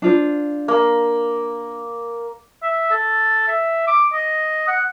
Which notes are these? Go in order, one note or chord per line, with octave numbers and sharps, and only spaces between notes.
D4 F4 C5
A#3
E5
A4
E5
D6
D#5
F#5